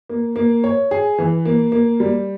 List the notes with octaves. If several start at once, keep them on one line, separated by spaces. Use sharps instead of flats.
A#3
A#3
C#5
G#4
E3
A#3
A#3
G3